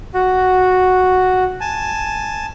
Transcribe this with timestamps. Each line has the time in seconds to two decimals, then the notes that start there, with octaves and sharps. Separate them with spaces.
0.14 F#4
1.61 G#5 A5